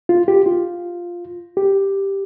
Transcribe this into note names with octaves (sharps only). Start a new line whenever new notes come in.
F4
G4
F4
G4